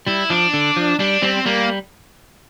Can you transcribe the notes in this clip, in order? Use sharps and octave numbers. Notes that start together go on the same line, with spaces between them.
G3 E4
F3 D4
D3
F3
G3 D4
G3 C4
G3 A#3